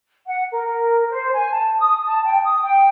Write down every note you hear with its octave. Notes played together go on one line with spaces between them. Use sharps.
F#5
A#4
C5
G#5
A5
D#6
A5
G5
D#6
G5